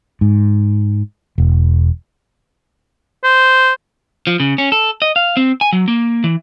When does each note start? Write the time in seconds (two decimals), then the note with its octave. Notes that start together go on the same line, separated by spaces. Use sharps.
0.21 G#2
1.38 E1
3.24 C5
4.27 F3
4.40 C#3
4.58 C#4
4.72 A4
5.02 D#5
5.16 F5
5.37 C4
5.61 G#5
5.73 F#3
5.88 A#3
6.24 E3